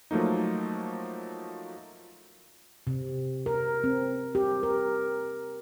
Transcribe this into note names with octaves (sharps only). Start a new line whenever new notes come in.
F3 F#3 A3 A#3 D#4
C3
A#4
C4
G4
A#4